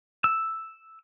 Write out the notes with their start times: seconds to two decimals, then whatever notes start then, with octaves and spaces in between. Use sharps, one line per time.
0.24 E6